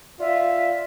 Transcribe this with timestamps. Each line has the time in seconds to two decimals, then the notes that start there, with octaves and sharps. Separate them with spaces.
0.20 F4 D5 E5 F5